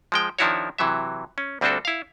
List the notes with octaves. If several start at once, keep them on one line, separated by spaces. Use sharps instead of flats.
F3 G#3 G5
D#3 F3 D4 E4 F#4 C#5
C3 E3 F#3 E5
C#4
D2 G3 C4 D4 F#4 A4
E4 F5